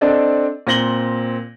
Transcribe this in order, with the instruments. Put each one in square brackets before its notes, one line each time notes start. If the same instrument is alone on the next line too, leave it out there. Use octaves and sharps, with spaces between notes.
[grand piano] C4 D4 A4 D5 D#5
A#2 C4 A#6 F#7 G7